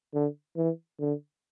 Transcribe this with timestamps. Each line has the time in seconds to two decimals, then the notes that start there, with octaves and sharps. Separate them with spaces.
0.14 D3
0.57 E3
1.00 D3